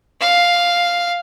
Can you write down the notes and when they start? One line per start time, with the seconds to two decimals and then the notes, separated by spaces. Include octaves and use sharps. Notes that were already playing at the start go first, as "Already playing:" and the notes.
0.21 F5